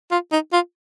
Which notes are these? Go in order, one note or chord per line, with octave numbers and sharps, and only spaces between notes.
F4
D#4
F4